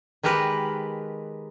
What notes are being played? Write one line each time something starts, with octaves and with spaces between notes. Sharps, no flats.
D#3 G#3 G4 A#4 B4